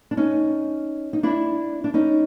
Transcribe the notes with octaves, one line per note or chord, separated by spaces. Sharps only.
D4
C#4 D#4
D#4
D4 E4
D4
C#4 D#4